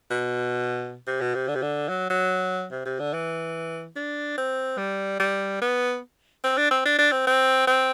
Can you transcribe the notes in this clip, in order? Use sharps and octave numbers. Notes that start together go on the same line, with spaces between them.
B2
C3
B2
C3
D3
C3
D3
F#3
F#3
C3
C3
D3
E3
D4
C4
G3
G3
B3
C4
D4
C4
D4
D4
C4
C4
C4